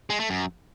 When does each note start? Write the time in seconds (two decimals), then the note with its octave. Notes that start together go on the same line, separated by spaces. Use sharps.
0.10 G#3
0.20 A3
0.30 F#2